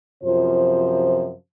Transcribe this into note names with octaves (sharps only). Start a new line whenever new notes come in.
F#2 C3 F3 F4 C5